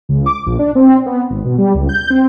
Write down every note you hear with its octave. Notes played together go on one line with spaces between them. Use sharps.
C#2
D6
A#1
D4
C4
B3
G#1
B2
G3
C#2
G6
C4